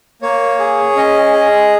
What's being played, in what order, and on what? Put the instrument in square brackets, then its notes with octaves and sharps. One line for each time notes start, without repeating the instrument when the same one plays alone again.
[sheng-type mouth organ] A#3 C#5
G#4
C#4 D#5
G#4